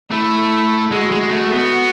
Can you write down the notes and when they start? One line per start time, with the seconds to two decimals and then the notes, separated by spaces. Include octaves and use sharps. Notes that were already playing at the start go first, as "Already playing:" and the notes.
0.10 A3 E4
0.91 G#3 F#4
1.11 G#3
1.31 A3
1.52 B3